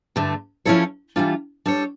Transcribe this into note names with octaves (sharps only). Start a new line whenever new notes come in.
G2 D3 A3
F3 C#4 E4 A4 C#5
E3 G3 D4 F4
G3 D4 A4 C#5